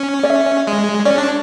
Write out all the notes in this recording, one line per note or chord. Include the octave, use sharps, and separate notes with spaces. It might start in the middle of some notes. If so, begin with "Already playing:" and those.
Already playing: C#4
D5
E5
G#3
C#4 D5
D4